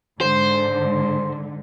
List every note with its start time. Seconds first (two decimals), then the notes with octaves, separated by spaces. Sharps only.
0.21 G#2 D3 C5